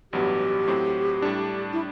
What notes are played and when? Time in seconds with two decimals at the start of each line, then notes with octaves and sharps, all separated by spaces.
0.12 A1 G2 F#3 B3 G4
0.67 A2 F#3 C4
1.22 A2 G3 D4
1.73 E4